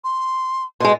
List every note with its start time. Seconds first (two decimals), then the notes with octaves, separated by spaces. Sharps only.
0.04 C6
0.80 B2 G#3 C6